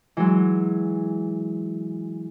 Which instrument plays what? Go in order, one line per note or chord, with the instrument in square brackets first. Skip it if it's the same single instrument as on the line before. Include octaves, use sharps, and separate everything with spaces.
[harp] E3 F#3 G#3